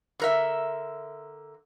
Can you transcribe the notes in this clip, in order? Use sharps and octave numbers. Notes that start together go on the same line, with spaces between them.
D3 A#4 E5